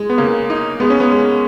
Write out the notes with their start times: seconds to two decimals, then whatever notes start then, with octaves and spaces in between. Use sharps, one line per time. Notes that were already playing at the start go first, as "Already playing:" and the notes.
Already playing: G#3
0.10 B3
0.18 C#3 A#3
0.50 D#4
0.80 G#3 B3
0.90 C#4
1.00 B3
1.11 G#3